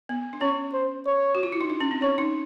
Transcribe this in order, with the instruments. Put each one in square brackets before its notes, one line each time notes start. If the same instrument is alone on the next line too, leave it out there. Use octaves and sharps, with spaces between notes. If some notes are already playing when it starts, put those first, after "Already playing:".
[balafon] B3
D4
[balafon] C#4 [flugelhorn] C#5
[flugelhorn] C5
C#5
[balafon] F#4
F4
E4
D#4
D4
C#4
C4
[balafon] C#4 [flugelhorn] C#5
[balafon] D#4